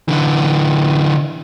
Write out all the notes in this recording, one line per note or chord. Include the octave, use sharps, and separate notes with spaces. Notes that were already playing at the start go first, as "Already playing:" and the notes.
D3 E3